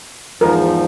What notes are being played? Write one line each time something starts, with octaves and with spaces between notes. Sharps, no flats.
E2 G#2 F3 A#4